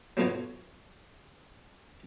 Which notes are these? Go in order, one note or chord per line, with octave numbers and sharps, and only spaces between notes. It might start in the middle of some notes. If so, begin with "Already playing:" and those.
F#3 A3 B3 F4 F#4 C#5